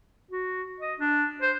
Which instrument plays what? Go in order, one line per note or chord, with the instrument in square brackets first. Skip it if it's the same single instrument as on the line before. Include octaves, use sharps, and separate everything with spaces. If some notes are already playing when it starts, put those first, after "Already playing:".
[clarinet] F#4
D#5
D4
C5